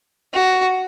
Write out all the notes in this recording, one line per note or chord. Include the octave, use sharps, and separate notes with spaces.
F#4